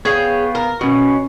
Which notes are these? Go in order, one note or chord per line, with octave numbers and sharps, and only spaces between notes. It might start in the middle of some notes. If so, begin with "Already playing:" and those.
B3 G#4 C#5 F5 G5
A#4
B2 C#4 F#4